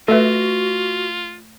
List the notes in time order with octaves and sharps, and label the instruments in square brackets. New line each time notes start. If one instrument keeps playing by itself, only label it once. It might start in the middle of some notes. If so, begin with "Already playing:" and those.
[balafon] A3 B4 [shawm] F4 [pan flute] F#4 [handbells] A4 E5